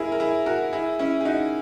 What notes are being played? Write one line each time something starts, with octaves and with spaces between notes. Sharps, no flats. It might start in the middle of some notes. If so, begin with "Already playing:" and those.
Already playing: E4 G#4 A#4
A#4
E4 G#4
F#4 A#4
E4 G#4
C#4 E4
G#4
D#4 F#4